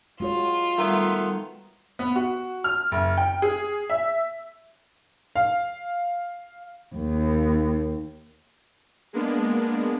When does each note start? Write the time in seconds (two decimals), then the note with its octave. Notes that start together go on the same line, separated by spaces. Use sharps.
0.20 G#3 F4 F#4 C#5
0.78 D#3 G3 A3 B3
1.99 B3
2.16 F#4
2.64 F6
2.92 F#1
3.17 G5
3.42 G#4
3.90 E5
5.36 F5
6.95 D#2
9.13 G#3 A#3 B3 D4